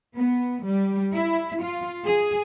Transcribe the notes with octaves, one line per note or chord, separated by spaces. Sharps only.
B3
G3
E4
F4
G#4